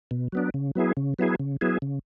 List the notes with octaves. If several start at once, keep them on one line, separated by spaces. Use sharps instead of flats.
B2
F#3 B3 D4
C#3
F#3 B3 E4 G#4
C#3
F#3 B3 E4 G#4
C#3
F#3 B3 E4 G#4
C#3